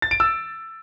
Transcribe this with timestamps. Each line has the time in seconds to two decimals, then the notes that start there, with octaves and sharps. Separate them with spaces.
0.02 A6
0.11 D7
0.20 E6